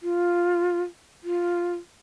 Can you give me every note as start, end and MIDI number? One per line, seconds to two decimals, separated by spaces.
0.03 0.82 65
1.24 1.74 65